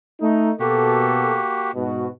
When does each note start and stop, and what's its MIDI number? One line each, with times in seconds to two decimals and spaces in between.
0.21 0.51 57
0.21 0.51 63
0.60 1.38 47
0.60 1.71 58
0.60 1.71 66
0.60 1.71 67
0.60 1.38 69
1.75 2.07 44
1.75 2.07 47
1.75 2.07 66